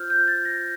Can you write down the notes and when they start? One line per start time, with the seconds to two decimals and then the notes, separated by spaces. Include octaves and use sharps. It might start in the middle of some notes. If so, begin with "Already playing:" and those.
Already playing: F4 C5 F6 G6
0.10 G6
0.28 A6
0.45 A#6